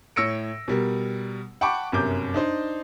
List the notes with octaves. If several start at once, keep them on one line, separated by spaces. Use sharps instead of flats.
A2 C#5 E6 A#6 C#7 D7
B2 G3 A#4
F#5 G5 A5 B5 C#6 D6
G1 F#2 C3 A#4 D6 G6
D4 D#4 C5